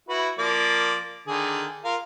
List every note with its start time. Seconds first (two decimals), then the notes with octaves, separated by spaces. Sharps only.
0.09 E4 F#4 B4
0.39 F3 A#3 D5
1.27 D3 D#3 G#4
1.85 F4 A#4 F5